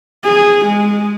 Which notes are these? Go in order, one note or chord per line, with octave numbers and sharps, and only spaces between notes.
G#4
G#3